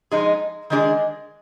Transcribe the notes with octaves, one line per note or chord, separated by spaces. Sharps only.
F3 G#3 D#4 G#4
D#3 G#3 D4 G#4